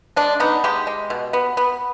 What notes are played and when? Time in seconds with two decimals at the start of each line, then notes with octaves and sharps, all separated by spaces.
0.16 G#3 D4
0.40 B3 D#4
0.64 G#3 G4
0.87 G#3
1.10 B2
1.33 B3
1.57 B3